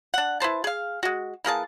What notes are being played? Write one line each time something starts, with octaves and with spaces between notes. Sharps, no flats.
D4 F#5
E4 B4 C5 A5
G#4 F5
G#3 F#4
E3 A#3 G#4 A5